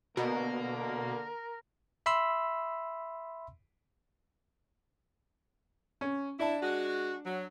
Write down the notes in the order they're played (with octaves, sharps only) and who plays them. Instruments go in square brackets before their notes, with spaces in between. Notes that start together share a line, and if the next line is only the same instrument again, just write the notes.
[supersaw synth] B2 [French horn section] D3 A#3 [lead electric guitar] A#4
[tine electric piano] E5 B5 C6 E6
[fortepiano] C#4
[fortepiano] D4 A5 [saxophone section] E4
[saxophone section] G#3 F#4
F#3